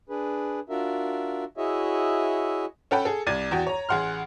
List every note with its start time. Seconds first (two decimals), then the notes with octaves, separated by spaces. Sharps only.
0.09 D4 G#4 B4
0.69 D4 F4 F#4 A#4 E5
1.58 E4 F#4 G#4 C#5 D#5 E5
2.91 C#4 A4 F#5 G5 B5
3.05 G#4 A4
3.27 C2 D5 G#6 A6 D#7
3.51 E2 F#4 G5
3.67 C#5 A#5
3.89 A1 G#4 F#5 C6 F6